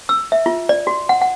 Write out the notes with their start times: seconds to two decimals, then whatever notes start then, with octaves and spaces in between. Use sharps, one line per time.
0.09 E6
0.32 E5
0.46 F4
0.69 D5
0.87 F#4
1.09 F#5
1.21 F#5